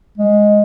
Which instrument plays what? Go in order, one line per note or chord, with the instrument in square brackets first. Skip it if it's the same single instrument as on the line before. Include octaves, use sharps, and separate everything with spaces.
[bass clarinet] G#3